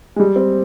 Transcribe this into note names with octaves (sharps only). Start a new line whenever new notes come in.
G#3
G3
C4